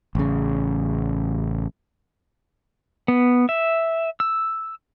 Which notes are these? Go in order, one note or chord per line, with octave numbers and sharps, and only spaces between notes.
A1 C#3
B3
E5
E6